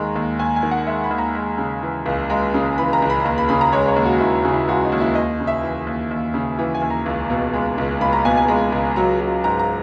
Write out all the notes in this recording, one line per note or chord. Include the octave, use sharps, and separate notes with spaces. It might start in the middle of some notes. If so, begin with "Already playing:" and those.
Already playing: D#2 D#3 G#3 A#5
D#2
D#2 G#5
G#5
D#3
F#5
G#3 E5
B5
D#2
A#5
G#3
C#3
E3
C#2
G#3 A#5
C#3
E3 B5
A#5
C#2
B5
D#2 A#5
B5
C#3 B5
A#5
G#3 C#5
C#5
D#2
F#4
D#2 E4
C#3
E4
G#3 F#4
D#4
D#2
E4
D#2 D#5
C#3
E5
E3
D#2
D#2
C#3
E3
G#5
D#2
A#5
C#2
B2
G#3
C#2
C#2 B5
A#5
B2 G#5
G#5
G#3 A#5
C#2
F#3 A#5
F#3
G#2 A#5
A#5